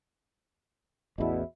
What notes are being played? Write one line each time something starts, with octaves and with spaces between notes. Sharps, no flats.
A1 E2 B2 E4